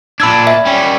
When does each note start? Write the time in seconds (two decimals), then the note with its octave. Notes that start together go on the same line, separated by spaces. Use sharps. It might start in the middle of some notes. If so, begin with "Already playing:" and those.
0.20 A#2 D4 B5 E6 G#6
0.47 E5
0.65 G3 C#4